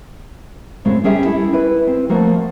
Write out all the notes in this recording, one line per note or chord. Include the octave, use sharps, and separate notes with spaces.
F#2 A2 C#3 G#3 C4
G3 C#4 G#4 E5 G5
E4 A4
E4 B4
C4
F3 A3 A#3 F#4